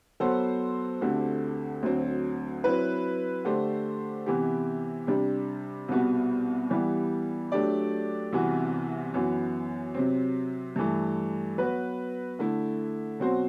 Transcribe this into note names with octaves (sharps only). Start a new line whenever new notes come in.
F#3 B3 F#4 A4 C5
D2 D3 A3 C4 G4
D2 D3 F#3 C4
F#3 C4 E4 B4
D3 A3 D4 G4 C5
C3 E3 B3 E4 G4
C3 G3 D4 G4
C2 B2 G3 B3 F#4
E3 G3 B3 E4 G4
F#3 A3 D4 G4 D5
C2 C3 E3 B3 F#4
F#2 E3 B3
C3 F#3 C4
G2 E3 A3
F#3 B3 F#4 B4
D3 A3 E4
B2 F#3 C4 F#4 C5